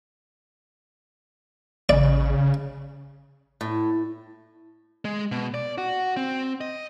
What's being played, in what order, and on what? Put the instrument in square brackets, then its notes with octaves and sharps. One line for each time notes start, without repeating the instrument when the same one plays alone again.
[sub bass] A1 [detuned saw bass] C#3 [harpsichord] D5
[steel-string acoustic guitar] A2
[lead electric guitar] G#3
B2
D5
F#4
C4
D#5